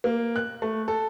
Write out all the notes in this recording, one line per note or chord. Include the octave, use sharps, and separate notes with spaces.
A#3
F#6
A3
A4